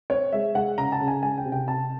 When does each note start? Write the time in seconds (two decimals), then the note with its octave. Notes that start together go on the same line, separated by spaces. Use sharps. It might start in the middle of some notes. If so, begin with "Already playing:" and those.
0.10 C4 C#5
0.32 G#3 E5
0.55 G#3 F#5
0.78 C#3 A#5
0.92 A5
1.00 C#3
1.08 G#5
1.22 G#3 G#5
1.38 G5
1.45 C3
1.52 G5
1.68 C3 A5